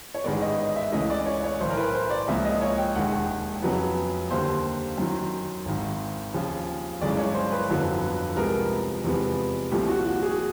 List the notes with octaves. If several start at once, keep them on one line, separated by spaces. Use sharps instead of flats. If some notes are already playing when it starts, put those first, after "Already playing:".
C#5
A1 G#2 D#3 G#3 B3 D5
D#5
D#5
E5
C#2 C#3 E3 A3 D#5
D5
C#5
C#5
B1 A2 E3 C5
A#4
B4
C5
D5
C#2 C#3 F3 A#3 E5
D#5
C#5
G5
E1 D#2 D#3 G#3 F#5
F2 C#3 F#3 B3
D#2 D3 G3 A#3 C5
F#2 D#3 F#3
G#1 G#2 D#3
D#2 C#3 F3
G1 F#2 C#3 E3 G#3 D5
C#5
C5
B4
G1 F2 D3 F#3 B3
C2 C3 F3 G#3 B3 A#4
E2 C3 F3 G#3 B3
C2 A#2 F3 A3 G4
F#4
F#4
G#4